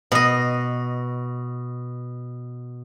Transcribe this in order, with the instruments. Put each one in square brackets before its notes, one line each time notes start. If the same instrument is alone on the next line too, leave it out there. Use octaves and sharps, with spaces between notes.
[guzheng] B2 D#5